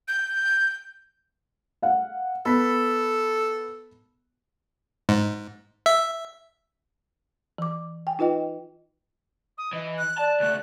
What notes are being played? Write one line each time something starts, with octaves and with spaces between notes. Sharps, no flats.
G6
F5 F#5
B3 A4 B5 B6
G#2
E5
E3 D6
G5 G#5
D#4 F4 B4 D#5 G5
D#6
E3 D#5
F#6
D5 A5
C#2 A3 F#6